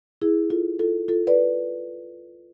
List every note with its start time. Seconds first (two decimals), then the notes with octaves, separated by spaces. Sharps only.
0.22 E4 G#4
0.50 F4 A4
0.79 F4 A4
1.08 F4 A4
1.27 B4 D5